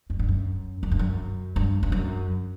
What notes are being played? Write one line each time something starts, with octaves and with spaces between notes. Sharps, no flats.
F#2
G2
F#2
F#2
G2
F#2
G2
G2
F#2